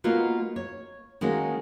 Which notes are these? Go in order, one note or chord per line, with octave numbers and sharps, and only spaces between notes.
G#3 A#3 B3 D#4 F4 F#4
C#5
D#3 G#3 A#3 C#4 F#4